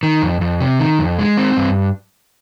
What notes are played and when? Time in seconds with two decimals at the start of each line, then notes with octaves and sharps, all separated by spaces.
0.03 D#3
0.22 F2
0.41 F2
0.60 C3
0.80 D#3
0.99 F2
1.19 G#3
1.37 C4
1.57 G2